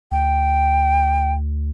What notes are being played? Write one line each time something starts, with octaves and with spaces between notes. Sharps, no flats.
D2 G5